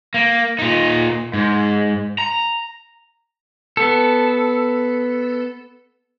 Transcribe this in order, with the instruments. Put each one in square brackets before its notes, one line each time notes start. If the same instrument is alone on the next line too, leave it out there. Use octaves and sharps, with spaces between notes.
[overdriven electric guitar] A#3
A#2 D#4
G#2
A#5
[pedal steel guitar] B3 A4